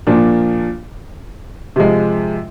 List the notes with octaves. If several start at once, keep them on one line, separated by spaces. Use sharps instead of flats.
A#2 F3 A#3 D4
C3 F3 G#3